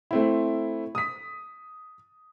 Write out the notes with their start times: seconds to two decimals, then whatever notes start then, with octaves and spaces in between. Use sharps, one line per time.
0.11 A3 C4 E4
0.95 D#6 B6